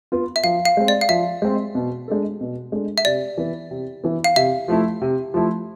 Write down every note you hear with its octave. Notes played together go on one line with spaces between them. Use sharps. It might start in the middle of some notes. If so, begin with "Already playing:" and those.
B3 F4
E5
F3 F5
F5
G#3 C4
D5
F5
F3 E5
G#3 C4
B2
G#3 D4 A4
B2
G#3 D4 A4
E5
C3 D5
E3 B3
C3
E3 B3
F5
C3 E5
F3 A3 E4
C3
F3 A3 E4